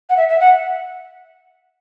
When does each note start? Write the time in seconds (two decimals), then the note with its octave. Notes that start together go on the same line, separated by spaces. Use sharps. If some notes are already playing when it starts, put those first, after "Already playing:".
0.10 F#5
0.17 E5
0.29 E5
0.40 F#5